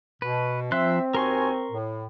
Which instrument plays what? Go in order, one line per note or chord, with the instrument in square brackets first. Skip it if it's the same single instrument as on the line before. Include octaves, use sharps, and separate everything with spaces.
[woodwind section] B2 [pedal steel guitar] B4
[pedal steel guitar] F3 C6 F#6 [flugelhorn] C4 [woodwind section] E5
[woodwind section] D#2 F#4 G#5 [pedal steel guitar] A#4 C6 C#6
[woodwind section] A2